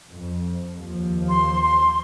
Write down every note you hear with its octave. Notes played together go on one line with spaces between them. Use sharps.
F2
D#2 F3
C6
C6